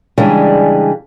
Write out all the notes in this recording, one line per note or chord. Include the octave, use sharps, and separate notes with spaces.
C#3 E3 G3 G#3 D4